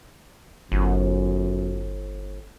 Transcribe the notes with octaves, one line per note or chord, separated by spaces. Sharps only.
G1 F#2